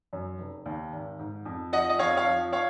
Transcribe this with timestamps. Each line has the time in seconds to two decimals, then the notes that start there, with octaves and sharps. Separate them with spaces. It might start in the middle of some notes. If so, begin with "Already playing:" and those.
0.13 F#2
0.39 F1
0.66 D#2
0.92 G#1
1.19 G#2
1.45 F2
1.73 F3 D#5 F#5
1.90 D#5
1.99 F2 C#5 F5
2.17 C#5 F5
2.26 F3
2.53 C#5 F5